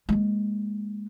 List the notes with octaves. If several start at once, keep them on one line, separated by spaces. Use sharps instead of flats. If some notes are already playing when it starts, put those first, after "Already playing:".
G#3 A#3